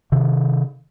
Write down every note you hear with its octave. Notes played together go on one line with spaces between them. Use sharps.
C3 D#3